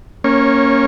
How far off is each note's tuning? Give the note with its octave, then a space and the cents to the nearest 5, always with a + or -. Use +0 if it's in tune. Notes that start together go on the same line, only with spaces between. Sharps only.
A#3 +0 C#4 +0 C#5 -25